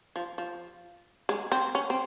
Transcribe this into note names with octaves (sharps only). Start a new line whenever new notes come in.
F3
F3
G#3
C4
C#4
C4